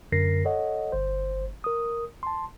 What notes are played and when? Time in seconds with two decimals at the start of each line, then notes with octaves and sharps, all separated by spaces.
0.12 F#2 D3 A#4 A#6 C7
0.45 A4 C#5 D#5 F#5
0.92 G1 C5
1.64 A#4 D#6
2.23 A5 C6